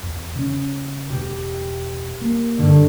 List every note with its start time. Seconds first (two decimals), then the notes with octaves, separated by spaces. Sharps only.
0.03 E2
0.36 C#3 C#4
1.10 E1 G4
2.22 A#3
2.58 G2 D3